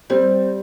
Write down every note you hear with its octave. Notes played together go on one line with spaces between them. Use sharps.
G3 C4